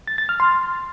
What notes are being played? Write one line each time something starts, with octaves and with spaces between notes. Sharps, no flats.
A6
A6
F6
C6